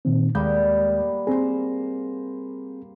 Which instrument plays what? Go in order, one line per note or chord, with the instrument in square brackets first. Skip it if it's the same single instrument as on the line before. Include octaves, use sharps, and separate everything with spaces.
[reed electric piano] A#2 D#3 C4
[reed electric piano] D#2 G#3 G6 [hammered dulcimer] G3 A#3 B3
[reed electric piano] C4 G#4 [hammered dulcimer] A#4 C5